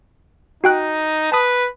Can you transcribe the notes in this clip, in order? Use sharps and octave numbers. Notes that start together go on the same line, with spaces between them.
D#4 F#4 G5 F#6
B4 A5 D#6